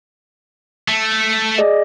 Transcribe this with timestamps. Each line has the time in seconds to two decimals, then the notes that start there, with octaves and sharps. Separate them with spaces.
0.88 A3
1.58 G#4 D5 D#5